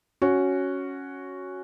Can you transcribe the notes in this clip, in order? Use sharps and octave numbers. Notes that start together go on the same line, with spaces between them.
C#4 F#4